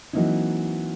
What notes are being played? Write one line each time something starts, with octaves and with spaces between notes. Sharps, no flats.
E3 F#3 A#3 C4 D#4 E4